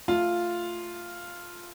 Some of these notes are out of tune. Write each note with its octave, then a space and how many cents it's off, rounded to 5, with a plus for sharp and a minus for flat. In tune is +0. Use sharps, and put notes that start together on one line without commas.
A3 +0 F4 +0